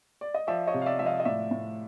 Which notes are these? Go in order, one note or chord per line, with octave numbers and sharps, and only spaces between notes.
D5
D#5
F3 D5 E5
C#5 D#5
C3
F5
D5 E5
F3 E5
D#5 F5
D#5
A2 D5 E5
A2